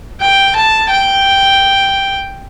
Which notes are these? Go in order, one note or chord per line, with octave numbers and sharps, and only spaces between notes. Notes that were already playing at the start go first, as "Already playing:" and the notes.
G5
A5
G5